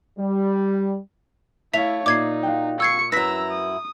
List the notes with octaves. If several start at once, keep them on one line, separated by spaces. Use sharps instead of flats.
G3
A3 E4 C#5 E5 F5 B6 F7
A#2 D#4 D6 G#6 C7
F4 F#4 G5
C#6 E6 G#6 C7 C#7
F#2 E4 B4 A#5 E6 A#6 B6
D#6